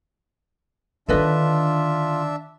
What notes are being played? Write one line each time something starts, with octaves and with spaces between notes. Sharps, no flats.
D3 D#3 D4 F4 A4 B4 D#5 E5